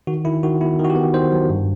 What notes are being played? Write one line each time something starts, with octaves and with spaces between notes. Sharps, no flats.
D#3 F#4
D#3 E4
D#3 F#4
B3 E4
D#3
F#4
G4
B3
D#3 C5
F#3
G2